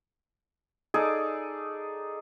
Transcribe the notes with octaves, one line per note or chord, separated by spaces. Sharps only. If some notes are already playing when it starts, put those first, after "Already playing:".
D#4 G#4 A4 D5